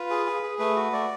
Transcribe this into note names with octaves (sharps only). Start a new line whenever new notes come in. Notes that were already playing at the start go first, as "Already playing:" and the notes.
Already playing: F4 B4
G#4
G#4
G#4
A3 B4
F#4
A3 D5